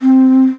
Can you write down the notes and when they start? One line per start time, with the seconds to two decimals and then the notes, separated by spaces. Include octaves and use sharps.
0.02 C4